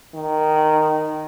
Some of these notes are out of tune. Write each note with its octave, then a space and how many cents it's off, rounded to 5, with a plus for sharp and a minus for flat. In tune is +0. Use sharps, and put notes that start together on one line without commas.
D#3 -10